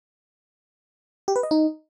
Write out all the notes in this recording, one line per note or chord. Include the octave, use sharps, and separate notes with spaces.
G4
B4
D#5
D#4